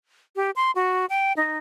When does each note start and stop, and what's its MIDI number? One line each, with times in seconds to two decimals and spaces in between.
0.36 0.51 67
0.56 0.71 84
0.75 1.06 66
1.10 1.33 79
1.37 1.58 63